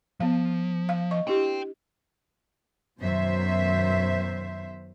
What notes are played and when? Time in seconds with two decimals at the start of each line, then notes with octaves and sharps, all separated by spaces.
0.20 F3 B3 F5
0.89 F5
1.11 D#5 C#6
1.27 D4 E4 G4 G5 C6
2.99 F#2 B2 D#3 C5 E5